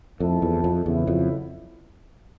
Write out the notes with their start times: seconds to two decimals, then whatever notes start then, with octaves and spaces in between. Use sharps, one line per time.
0.20 F2 F3 A3 C4 E4 A4
0.42 E2
0.64 F2
0.85 E2 C#3 F#3 B3 E4
1.07 F2